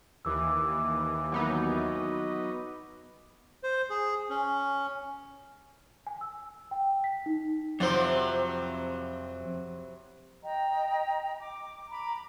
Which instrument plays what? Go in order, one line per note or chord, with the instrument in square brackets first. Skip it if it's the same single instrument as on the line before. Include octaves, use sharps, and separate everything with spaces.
[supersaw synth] D#2 E3 [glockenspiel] D6 E6
[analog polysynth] F#3 B3 D#4
[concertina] C5
G#4
C#4
[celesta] G#5
E6
G5
B6
D#4
[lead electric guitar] F2 C5 [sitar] C3 E3 F#3
[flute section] D#5 G5 A#5
D6
A#5 B5 D6